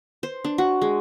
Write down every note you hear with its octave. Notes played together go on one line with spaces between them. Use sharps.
C5
D4
F#4
G#3